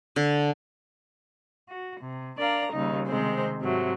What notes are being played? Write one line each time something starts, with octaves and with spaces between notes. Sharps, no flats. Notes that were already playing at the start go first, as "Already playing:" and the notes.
D3
F#4
C3
D4 A#4 D5 F5 A#5
D#2 C#3 G3 D#4
C3 D#3 G#3 C4 C5
G#2 C3 F#3 A3